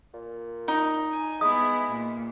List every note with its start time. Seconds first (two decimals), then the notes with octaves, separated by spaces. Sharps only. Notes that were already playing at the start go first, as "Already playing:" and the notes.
0.14 A#2
0.68 D#4
1.11 G#5
1.41 G#3 B3 E4 D#6
1.88 A#2